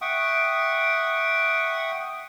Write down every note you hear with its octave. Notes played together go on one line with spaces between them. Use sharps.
E5 F#5 G5 C#6 D#6